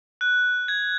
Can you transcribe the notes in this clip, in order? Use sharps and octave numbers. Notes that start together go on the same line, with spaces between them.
F#6
G#6